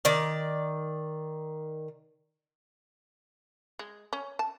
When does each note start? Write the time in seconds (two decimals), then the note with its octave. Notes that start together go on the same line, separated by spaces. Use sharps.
0.05 D#3 D5
3.79 G#3
4.13 C#4
4.39 A5